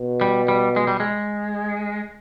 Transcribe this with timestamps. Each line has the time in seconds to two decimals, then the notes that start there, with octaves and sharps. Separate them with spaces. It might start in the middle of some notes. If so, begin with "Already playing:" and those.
Already playing: B2
0.21 G3
0.48 G3
0.76 G#3
0.87 G3
1.00 G#3